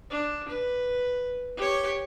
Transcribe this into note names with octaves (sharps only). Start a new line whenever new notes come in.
D4
B4
G4 C#5